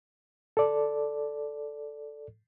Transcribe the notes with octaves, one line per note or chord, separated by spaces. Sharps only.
A4 D5